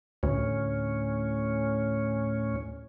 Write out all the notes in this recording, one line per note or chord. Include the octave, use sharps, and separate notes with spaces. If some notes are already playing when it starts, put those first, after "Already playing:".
D2 A2 C#4